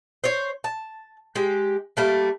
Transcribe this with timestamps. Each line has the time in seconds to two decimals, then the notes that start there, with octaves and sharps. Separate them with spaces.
0.24 C5 C#5
0.64 A5
1.35 G#3 G4
1.97 G3 A3 A#3